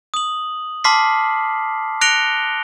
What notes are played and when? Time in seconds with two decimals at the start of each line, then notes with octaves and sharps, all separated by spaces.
0.14 D#6 F#7
0.84 A5 C6 D6 F6 B6 C7
2.01 F#6 A#6 C#7 D7 F7 G7